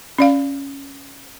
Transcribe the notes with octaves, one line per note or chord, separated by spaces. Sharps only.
C#4 D5 F5